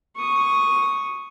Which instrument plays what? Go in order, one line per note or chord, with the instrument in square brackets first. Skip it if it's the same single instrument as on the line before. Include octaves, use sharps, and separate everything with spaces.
[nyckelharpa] C#6 D#6